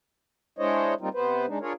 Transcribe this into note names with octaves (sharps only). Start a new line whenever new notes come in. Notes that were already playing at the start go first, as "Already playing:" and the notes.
G#3 D4 E4 C5 C#5 D#5
G3 A#3 C4 D#4 F4
C3 B3 B4 C5
G#3 D4 D#4
D4 F4 G#4 A#4 C#5